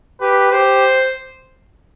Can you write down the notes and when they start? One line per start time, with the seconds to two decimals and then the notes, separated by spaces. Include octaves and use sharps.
0.20 G4 B4
0.52 G4 C5